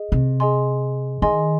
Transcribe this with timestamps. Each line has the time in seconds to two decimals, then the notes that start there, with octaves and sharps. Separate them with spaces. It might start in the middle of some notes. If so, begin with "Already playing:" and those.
Already playing: G#4 D#5
0.12 C3
0.40 G#4 D#5 G#5 C6
1.22 D#3 G#4 D#5 G#5 C6